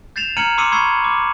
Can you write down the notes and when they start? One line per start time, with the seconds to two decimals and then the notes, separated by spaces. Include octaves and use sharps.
0.16 G6 A6 C7 E7 F7
0.37 A#5 F6 G#6 C#7 D#7 F#7
0.58 C6 D6 E6 C7 C#7 D#7
0.71 B5 C#6 E6 G#6 C7
1.04 D6